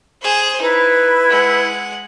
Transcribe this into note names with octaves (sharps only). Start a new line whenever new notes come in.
G#4 C5
D#4 E4 B4
G#3 F#5